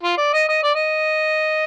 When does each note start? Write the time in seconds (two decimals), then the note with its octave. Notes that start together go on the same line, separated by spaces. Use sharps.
0.03 F4
0.18 D5
0.33 D#5
0.49 D#5
0.63 D5
0.75 D#5